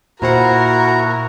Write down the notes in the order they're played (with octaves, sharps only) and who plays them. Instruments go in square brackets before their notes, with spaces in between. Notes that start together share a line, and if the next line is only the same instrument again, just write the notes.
[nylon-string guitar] A#2 C5 F#5 [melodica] E4 A#5 [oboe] F#4 [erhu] A#4